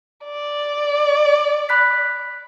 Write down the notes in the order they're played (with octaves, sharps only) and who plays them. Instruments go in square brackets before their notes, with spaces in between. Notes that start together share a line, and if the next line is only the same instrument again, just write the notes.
[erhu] D5
[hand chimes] B5 F#6 B6